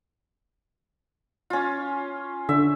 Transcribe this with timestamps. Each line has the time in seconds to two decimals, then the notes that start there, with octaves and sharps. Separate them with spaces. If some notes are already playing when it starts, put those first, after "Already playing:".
1.50 C#4 F4
2.49 D3 E5